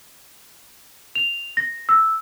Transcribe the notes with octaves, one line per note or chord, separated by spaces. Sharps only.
F7
A#6
E6